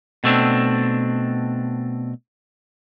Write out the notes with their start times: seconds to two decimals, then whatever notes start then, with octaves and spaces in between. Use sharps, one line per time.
0.24 B2 A3 C4 D4